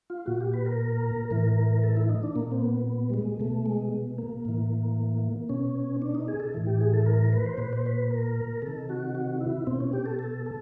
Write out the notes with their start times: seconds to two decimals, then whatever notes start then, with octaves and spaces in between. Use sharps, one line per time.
0.10 F4
0.26 A#2 F#4
0.40 G4
0.53 B4
0.66 A#4
1.31 A2 E3 A#4
1.83 A4
1.97 E4
2.10 D#4
2.23 D4
2.35 A#2 A#3
2.52 C4
2.62 B3
2.88 B3
3.10 G3
3.14 G#3
3.40 B2 A3
3.66 G#3
4.18 A#3
4.45 A2 E3
5.49 B2 C#4
6.02 D4
6.15 D#4
6.28 G#4
6.40 A4
6.54 A2 E3
6.67 G4
6.80 G#4
6.93 A4
7.06 A#4
7.33 B4
7.46 C5
7.58 A#2 B4
7.73 C5
7.86 B4
8.10 A#4
8.62 C3 D#3 A4
8.89 F#4
9.15 F#4
9.40 E4
9.67 B2 C4
9.80 C#4
9.93 G4
10.06 A4
10.19 A4
10.46 A4